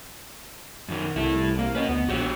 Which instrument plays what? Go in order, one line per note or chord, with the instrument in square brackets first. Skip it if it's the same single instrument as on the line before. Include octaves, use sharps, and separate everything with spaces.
[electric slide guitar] F#2 D#3 F#3
[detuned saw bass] C2 [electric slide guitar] E4 A4
[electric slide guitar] A#3 A#4
[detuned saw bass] C#4 [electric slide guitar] B4 D#5
[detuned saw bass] D2 [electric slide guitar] B3
[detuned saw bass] A#1 [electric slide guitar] F#4 G4 C#5